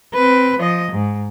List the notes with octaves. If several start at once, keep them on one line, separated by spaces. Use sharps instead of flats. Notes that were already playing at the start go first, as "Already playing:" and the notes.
C4 B4
F3 D#5
G#2